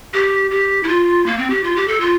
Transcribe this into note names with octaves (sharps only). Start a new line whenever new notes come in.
G4
G4
E4
F4
A#3
C4
G4
F4
G4
A4
F4